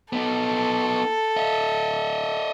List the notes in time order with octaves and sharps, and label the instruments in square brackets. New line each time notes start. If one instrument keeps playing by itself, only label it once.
[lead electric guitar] B3 D#4 [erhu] A4
[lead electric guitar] D#5 E5